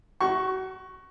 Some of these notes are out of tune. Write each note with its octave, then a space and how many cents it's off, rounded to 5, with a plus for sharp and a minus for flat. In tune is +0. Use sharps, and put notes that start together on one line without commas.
F#4 +30 C#6 +0